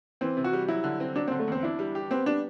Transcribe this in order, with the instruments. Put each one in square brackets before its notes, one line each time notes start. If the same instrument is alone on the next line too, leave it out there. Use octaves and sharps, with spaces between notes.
[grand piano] E3 [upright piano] C4
[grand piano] C3
[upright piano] F#4
[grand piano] G3
[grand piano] F#3 [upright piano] E4
[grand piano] D3
C4
[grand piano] F#3 [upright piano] D4
[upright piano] C4
[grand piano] D3
[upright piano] A3
[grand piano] E2 [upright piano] C4
[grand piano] D4 [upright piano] E4
[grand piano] G3
G4
[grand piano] B3 [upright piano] C4
[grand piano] G3 [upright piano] D4